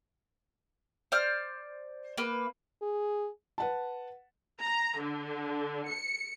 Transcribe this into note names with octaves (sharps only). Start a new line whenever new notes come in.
C5 D5 F6
A#3 B4
G#4
B4 F#5 A5
A#5
D3
C#7